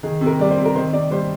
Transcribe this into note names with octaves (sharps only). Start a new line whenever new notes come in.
D#3 G#4
C3
A#4
G3 D5
C5
C3
A#4
D#3 C5
C3 D5
G3 C5